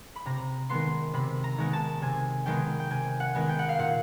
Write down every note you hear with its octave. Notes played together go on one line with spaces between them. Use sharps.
B5
C3 A#5
D#3 G#3 B3 C6
C3 B5
A#5
D#3 G#3 B3
A5
C3 G#5
D#3 G#3 B3 G5
G5
C3 G#5
F#5
D#3 G#3 B3
G5
F#5
F5
A#2 F#5